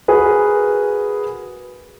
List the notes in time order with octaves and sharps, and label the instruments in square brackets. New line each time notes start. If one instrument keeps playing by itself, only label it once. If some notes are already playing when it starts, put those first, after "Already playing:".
[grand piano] F#4 G#4 A#4 B4